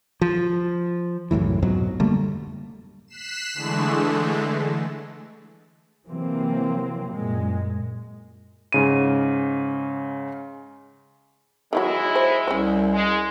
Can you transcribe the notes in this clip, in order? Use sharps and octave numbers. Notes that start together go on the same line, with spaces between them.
F3
C2 F#2 A2 E3
F2 G#2 B2 F#3
D3 G3 A3 A#3
F#6 B6 C7 E7
D3 E3 G#3 A3
C3 E3 F#3 A#3 C4
F#2 A#2 G#3
G#2 C#3 D#7
D#3 E3 F#3 G#3 E4
C5
C2 C#4 C5
G#3